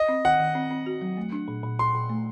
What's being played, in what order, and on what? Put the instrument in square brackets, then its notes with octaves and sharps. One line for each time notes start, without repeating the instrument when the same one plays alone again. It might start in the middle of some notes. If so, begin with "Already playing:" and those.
Already playing: [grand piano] D#5
[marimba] C4
[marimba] D#3 [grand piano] F#5
[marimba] D#3
C4
C4
F#4
F#3
A3
D4
A#2
A#2
[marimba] A#2 [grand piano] C6
[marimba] A#2
A3